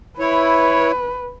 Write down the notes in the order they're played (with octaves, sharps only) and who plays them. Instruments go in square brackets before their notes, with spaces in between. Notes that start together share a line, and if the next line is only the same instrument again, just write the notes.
[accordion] E4 C#5 [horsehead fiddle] B4